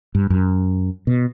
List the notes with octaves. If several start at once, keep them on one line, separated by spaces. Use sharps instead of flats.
G2
F#2
B2